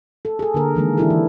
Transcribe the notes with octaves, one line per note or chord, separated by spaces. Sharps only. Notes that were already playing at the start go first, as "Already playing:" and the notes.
A4
G#4 A4
D3 A#3 A#4
D#3 E3 G#3 A#3
E3 D4 E4 G4 A4
E3